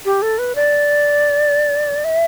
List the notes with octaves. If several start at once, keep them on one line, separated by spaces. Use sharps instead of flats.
G4
A4
B4
D5
E5